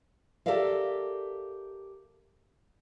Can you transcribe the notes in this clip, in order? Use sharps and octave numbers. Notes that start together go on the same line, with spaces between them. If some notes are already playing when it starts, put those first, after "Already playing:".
G4 A4 A#4 D5 E5 F5